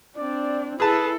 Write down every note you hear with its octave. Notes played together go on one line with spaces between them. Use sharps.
C4 D4 D5
E4 G#4 A4 B4 A5